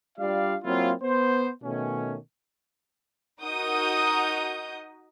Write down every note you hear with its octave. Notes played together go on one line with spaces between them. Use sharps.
G3 D4 F4 D5 F5
F#3 A#3 C4 E4 F4
B3 C5
B2 D#3 A3 C#4
D#4 F#4 A#4 D#5 D#6 G6